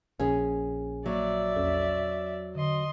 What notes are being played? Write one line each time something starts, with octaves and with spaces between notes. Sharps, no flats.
A#1 C#4 G#4
F#3 A#3 D5 E5
E2 C#4 A4
D3 D#5 C6